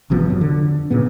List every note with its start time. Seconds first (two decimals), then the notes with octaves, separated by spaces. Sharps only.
0.10 G#1 C3 F3 B3
0.26 F2 F#3
0.41 D3
0.90 A#2 C#3 B3